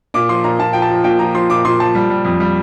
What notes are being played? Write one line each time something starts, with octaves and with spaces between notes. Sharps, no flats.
A#2 D6
F3 C6
A#2 A#5
A#2 A5
F3 G5
A5
F3
A#2 G5
F3 A#5
F3 C6
A#2 D6
A#2 C6
F3 A5
G3
G3
F2
G3